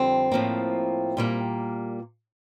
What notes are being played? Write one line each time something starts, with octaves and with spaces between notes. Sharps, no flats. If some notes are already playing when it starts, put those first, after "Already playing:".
Already playing: F2 D3 G3 C4
A2 F3 A#3
A#2 G3 A#3